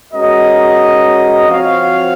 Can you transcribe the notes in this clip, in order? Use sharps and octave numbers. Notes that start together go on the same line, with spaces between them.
G#3 C#4 F#4 A#4 D#5
F3 C4 F#4 C#5 F5